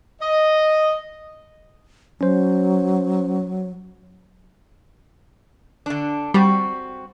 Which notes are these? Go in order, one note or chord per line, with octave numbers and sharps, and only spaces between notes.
D#5
F#3 C#4 C5
D3 D4
G3 C4 F#4